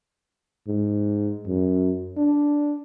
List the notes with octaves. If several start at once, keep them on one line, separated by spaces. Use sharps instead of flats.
G#2
F#2
D4